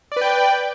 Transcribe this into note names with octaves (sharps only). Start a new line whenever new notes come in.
B4 D5 G5